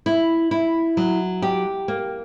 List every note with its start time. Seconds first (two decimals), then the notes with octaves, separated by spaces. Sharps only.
0.06 E4
0.51 E4
0.97 F#3
1.42 G4
1.88 A#3